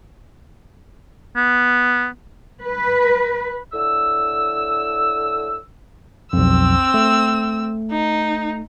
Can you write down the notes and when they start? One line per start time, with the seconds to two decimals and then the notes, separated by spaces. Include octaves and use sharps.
1.36 B3
2.62 B4
3.73 A2 D3 E6
6.33 B1 F2 C4 E6
6.94 A3
7.91 D#4